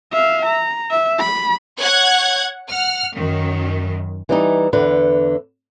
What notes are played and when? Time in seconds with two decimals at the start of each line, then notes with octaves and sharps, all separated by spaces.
0.13 E5 F5
0.46 A#5
0.91 E5
1.19 B5
1.80 C#5 F#5 F#6 G#6
2.69 F#5 F6
3.14 F#2 D#3
4.29 E3 G3 D#4
4.73 E2 D3 B4